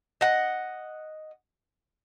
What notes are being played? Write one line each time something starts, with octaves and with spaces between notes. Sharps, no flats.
D#5 F#5